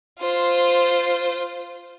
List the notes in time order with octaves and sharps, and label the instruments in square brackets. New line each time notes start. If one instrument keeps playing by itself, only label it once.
[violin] F4 C5